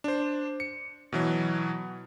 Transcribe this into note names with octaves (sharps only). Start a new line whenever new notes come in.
D4 C5
C#7
B2 E3 F#3